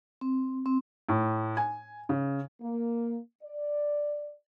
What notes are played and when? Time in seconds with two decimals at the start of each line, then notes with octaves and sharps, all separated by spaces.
0.21 C4
0.66 C4
1.09 A2
1.57 G#5
2.09 C#3
2.60 A#3
3.43 D5